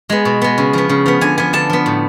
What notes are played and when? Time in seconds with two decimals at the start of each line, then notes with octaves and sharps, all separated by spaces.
0.10 G#3 B3
0.25 B2
0.42 G#3 B3
0.58 C#3
0.73 F3 B3
0.89 C#3
1.06 F3 B3
1.21 D3 G#5
1.38 F3 B3 G#5
1.53 D3 A5
1.70 F3 B3
1.86 A2